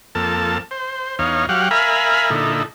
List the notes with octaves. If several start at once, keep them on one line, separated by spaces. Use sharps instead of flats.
F2 A#3 A4 A5
C5
E2 D#4 C#5 F5
F#3 G4 F5 F#5
A#4 E5 F5 G#5 B5
A#2 D3 D#4 E4 A4